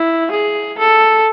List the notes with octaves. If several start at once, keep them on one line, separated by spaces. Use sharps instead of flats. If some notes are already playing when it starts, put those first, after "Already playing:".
Already playing: E4
G#4
A4